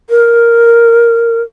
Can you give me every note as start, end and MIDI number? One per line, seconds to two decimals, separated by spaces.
0.10 1.42 70